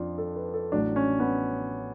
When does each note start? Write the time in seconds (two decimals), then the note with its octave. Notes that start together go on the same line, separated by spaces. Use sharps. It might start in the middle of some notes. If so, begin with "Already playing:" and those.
Already playing: F2 F3 D4 F4
0.18 A4
0.36 B4
0.54 A4
0.72 A1 A2 F#3 D4
0.96 C#4
1.20 B3